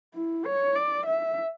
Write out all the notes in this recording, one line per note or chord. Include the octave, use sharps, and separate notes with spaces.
E4
C#5
D5
E5